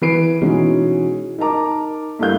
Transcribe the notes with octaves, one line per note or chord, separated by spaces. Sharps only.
E3 B4 C7 D7
B2 E3 G#3 C#4 D#4 G#4
D#4 A#4 A5 A#5 D6
G2 A3 E4 A#4 F5 G6